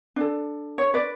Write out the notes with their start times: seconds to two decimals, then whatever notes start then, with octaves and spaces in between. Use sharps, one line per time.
0.16 D4 A4
0.78 C#5
0.94 B4 D5